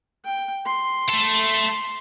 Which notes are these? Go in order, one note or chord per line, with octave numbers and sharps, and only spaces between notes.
G5
C6
A3 A4